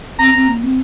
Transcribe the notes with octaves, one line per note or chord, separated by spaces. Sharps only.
C4 A#5
C4
A#3
C4